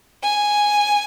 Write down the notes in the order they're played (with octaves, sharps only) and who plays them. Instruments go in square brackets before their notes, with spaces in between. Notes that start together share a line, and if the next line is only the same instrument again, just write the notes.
[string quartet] G#5